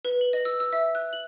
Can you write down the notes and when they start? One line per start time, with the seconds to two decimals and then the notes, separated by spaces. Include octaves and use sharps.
0.05 B4
0.21 F#7
0.33 D#5
0.45 E6
0.60 E6
0.73 E5
0.95 F#6
1.13 F#7